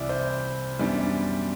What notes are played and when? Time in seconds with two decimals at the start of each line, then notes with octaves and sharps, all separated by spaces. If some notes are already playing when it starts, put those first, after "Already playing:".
Already playing: C2 C3 E3 D5 E5
0.09 C5
0.79 F#2 E3 G3 B3 D4